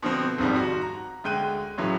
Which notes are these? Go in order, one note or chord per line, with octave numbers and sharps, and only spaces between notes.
B2 D3 F3 C4
G#1 F2 G#2 D#3 F3 G3
F#4
A#5
D2 G#3 G5 F#6 D#7
A2 C#3 E3 F#3